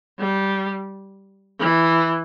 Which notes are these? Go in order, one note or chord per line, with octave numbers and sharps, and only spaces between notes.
G3
E3